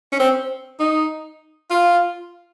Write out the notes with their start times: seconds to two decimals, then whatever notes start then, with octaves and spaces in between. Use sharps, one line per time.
0.12 C#4
0.20 C4
0.80 D#4
1.70 F4